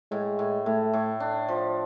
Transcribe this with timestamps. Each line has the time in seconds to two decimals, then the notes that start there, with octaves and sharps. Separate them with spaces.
0.11 A2 G#3
0.39 A2
0.66 A2 A3
0.93 A2
1.20 D4
1.48 F3